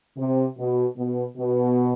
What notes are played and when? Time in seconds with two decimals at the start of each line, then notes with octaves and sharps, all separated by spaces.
0.17 C3
0.57 B2
0.96 B2
1.37 B2